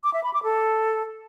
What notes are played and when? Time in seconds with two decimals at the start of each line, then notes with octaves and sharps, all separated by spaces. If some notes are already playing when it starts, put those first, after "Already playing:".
0.04 D6
0.14 E5
0.24 B5
0.34 D6
0.44 A4